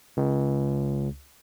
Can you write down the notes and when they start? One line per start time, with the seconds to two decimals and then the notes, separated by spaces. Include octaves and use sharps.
0.17 C#2